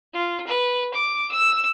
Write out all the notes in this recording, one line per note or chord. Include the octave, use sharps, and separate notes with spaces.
F4
B4
D6
E6